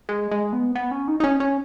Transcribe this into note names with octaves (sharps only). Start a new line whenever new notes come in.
G#3
G#3
B3
B3
C#4
D#4
D#4
C#4
C#4